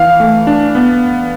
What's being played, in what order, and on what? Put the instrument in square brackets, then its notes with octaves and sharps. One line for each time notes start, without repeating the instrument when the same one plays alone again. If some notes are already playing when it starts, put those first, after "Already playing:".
Already playing: [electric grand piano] E3 [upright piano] F5
[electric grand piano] A3
D4
B3